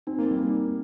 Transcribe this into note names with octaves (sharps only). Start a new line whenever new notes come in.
C4 D#4
A#3
G3
A#3 D#4